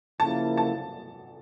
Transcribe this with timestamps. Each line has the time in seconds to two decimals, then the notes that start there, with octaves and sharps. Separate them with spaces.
0.20 C#3 F3 A#3 E4 A5
0.57 A5